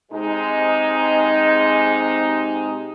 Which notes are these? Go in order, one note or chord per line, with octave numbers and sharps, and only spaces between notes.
C3 G#3 D#4